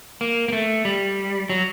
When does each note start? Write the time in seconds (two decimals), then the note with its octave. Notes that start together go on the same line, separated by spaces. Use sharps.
0.21 A#3
0.48 A#3
0.53 A3
0.85 G3
1.49 F#3